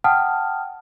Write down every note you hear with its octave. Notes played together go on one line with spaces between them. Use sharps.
F#5 G5 A5 D#6 F6